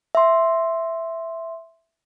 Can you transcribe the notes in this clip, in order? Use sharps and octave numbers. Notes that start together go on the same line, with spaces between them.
E5 C6